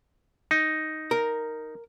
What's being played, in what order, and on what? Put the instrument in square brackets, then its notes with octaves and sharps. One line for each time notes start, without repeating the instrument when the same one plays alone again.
[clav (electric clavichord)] D#4
[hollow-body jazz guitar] A#4